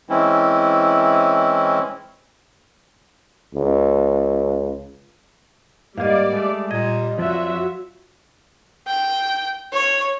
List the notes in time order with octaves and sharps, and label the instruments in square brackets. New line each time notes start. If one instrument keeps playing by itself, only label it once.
[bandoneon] E3 G#3 C4 C#4 E4
[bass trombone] C#2
[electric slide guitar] G#2 A#3 [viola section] G3 D5 [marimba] D#5 F5
[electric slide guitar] G#3 A3
[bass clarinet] A#2 [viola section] G3 [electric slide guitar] D#5 [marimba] G#6
[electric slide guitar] F2 F3 D5 [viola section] F#3 F#4 E5 [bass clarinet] F4
[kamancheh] G5
C#5